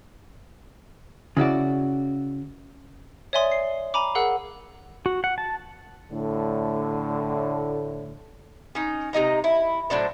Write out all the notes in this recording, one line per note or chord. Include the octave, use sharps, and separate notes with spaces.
C#3 E4 F#4 D5
C#5 D5 E5 G#5 C6 D#6
C7
G#5 A#5 B5 D6
G#4 A#4 F5 F#5 E6 F#6
F#4
F#5
A5
A2 D3
C#4 D#4
C3 D#4 D#5 A#5
E4
A2 F#3 D4 C5